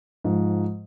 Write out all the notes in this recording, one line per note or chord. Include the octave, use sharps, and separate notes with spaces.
G#2 F3